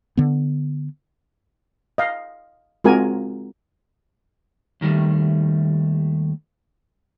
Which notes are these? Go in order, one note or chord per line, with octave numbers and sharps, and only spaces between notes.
D3 B3
D#5 F5
G#3 C4 F4 F#4 A#4 G#5
D#2 D#3 G3 A3